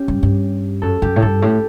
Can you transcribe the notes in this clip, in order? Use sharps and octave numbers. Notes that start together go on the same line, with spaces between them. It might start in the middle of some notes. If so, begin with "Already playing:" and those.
Already playing: C#4 G4
G2
G2
F#2 A4
F#2 G4
A2
G2 A4
A2 G4